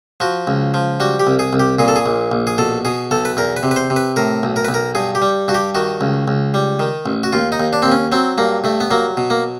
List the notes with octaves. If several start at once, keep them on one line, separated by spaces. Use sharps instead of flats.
F3 F#4
C#2
F3
G3 F#4
G4
C2
G#4
C2
G4
A#2 G#4
A4
G#4
A#1
A#1
G#4
B2 A4
B2 G#4
B1 A4
B4
E2 A#4
B4
C3
B4
C5
C3
B4
A2 A#4
B1
A#4
B1 B4
A#4
G2 G#4
G4
G3
G2 F#4
G4
D#3 F#4
C#2
C#2
G3
D#3
A1
F#4
D#2 F4
D#4
D#2
D4
D#2 C4
C#4
F#3 C4
G2 A#3
G2 A3
B3
F#3 A#3
B2
A#3